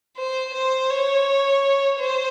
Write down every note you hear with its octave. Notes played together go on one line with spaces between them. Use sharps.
C5
C5
C#5
C5